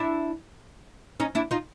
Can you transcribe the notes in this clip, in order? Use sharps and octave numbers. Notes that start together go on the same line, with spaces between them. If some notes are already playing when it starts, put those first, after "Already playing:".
Already playing: D4 E4
C#4 D#4
D4 E4
D#4 F4